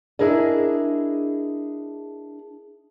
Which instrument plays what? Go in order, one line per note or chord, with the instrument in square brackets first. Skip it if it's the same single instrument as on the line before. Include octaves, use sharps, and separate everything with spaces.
[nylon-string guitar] D4 E4 G#4 A#4 D#5